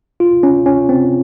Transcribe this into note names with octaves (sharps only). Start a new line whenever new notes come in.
F4
C#4
C#4
C4